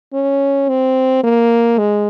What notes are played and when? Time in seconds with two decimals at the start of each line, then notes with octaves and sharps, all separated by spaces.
0.14 C#4
0.69 C4
1.24 A#3
1.79 G#3